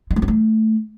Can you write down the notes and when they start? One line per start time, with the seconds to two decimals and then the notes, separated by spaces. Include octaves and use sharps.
0.11 G#3
0.16 A3
0.22 C4
0.28 A3